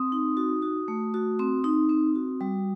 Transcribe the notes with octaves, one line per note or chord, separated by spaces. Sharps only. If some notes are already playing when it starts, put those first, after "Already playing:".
Already playing: C4 D#6
D#4
F#4
F#4
A3
F#4
C4
D#4
C4
F#4
G3